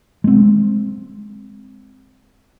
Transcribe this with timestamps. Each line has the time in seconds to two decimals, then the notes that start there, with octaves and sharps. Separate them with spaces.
0.24 G#3 C4